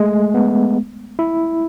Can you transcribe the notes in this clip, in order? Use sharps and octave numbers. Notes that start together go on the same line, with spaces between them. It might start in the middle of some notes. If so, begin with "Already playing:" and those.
Already playing: G#3 A3
B3
E4